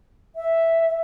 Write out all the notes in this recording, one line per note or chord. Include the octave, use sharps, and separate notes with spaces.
E5